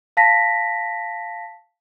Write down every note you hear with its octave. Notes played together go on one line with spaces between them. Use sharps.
F5 A5 A#6 B6